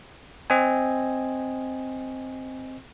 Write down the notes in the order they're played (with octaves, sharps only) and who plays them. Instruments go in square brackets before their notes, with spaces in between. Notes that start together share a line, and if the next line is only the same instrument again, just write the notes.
[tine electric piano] C4 D#5 G#5